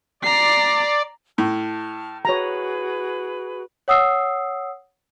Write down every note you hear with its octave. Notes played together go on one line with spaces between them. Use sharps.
D5 A#5 C7
A2 A5 F6
F#4 G#4 B4 C#5 A#5
C#5 F#5 D#6 E6 C7